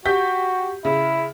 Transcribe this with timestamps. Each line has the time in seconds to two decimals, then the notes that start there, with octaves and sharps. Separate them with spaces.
0.05 F#4 G4 G6 B6
0.85 C#3 E4